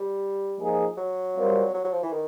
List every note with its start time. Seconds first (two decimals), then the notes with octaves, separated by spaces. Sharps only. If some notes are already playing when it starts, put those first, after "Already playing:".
Already playing: G3
0.60 F3 A#3 D#4 G#4
0.97 F#3
1.36 G3 C4 F4 A#4 D5
1.74 F#3
1.84 F#3
1.93 F3
2.03 E3
2.13 D#3